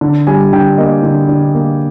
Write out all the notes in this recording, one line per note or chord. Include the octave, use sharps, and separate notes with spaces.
D3
G3 G#5
D3 G5
A#3 D#5
D3
D3
A#3